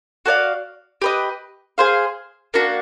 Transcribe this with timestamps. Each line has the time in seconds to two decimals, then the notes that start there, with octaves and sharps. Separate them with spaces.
0.26 F#4 A4 D5 F5
1.02 G4 B4 D#5
1.78 G#4 C5 F5
2.54 A#3 D4 F#4